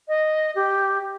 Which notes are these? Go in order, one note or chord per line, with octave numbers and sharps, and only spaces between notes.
D#5
G4